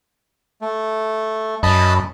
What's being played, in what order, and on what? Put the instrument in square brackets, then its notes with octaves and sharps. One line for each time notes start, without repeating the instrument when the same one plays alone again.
[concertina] A3
[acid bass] F#2 [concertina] D#5 A5 B5